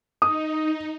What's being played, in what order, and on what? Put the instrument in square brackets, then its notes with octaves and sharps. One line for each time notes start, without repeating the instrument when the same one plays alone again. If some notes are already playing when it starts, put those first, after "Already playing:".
[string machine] D#4 [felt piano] D#6